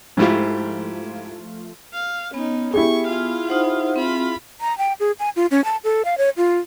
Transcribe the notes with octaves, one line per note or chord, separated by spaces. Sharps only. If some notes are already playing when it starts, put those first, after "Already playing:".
G#2 F3 A3 E4 F4 G4
F5
B3 C#4 D#4
E4 G4 G#4 C#6
F4 F5
D#4 C5 F#5
C4 F4 B5
A#5
G5
G#4
G#5
F4
C#4
A5
A4
F5
C#5
F4